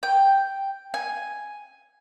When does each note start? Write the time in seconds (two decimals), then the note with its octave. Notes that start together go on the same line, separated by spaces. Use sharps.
0.03 G5
0.94 G#5